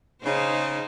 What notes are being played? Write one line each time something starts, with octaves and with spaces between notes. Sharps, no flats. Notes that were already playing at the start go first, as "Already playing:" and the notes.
C#3 D#4 C5